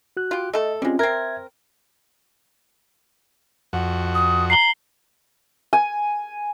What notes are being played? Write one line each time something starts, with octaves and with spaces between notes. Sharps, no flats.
F#4 F#6
F4 G4
A3 A4 D#5
G3 G#3 C4 C#4 F4
C4 A#4 E5 G#6
F2 F#4 F#5
D#6
A#5 C7 F#7 G7
G#5